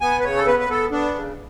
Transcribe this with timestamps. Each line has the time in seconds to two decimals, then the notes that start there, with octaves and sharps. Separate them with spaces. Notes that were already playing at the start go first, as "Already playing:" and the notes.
0.01 B3 G#5
0.20 B4
0.24 C#3 C#5
0.37 A4
0.47 B3 B4
0.59 B4
0.69 B3 A4
0.91 B3 D4
1.14 C#3